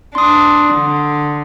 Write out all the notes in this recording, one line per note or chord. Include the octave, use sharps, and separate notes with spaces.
D4 C6 D#6
D3